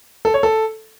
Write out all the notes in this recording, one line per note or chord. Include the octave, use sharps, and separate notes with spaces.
A4
C#5
A4